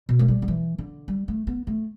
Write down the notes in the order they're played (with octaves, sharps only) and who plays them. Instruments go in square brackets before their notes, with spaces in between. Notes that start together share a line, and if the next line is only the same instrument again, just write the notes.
[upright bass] B2
A3
G3
D3
E3
D3
G3
A3
B3
A3